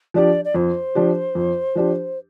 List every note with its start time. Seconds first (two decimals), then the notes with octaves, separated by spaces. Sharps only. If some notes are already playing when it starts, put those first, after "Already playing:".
0.14 F3 D4 G4 D5
0.44 D5
0.54 F2 C5
0.95 F3 D4 G4
1.35 F2
1.75 F3 D4 G4